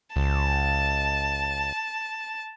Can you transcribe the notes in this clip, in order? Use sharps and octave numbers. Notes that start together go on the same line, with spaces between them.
C#2 A5